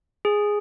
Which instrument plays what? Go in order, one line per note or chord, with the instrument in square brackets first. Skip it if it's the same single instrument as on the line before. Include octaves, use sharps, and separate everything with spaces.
[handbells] G#4